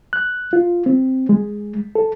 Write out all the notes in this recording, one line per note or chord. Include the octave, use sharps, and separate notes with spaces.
F#6
F4
C4
G#3
A4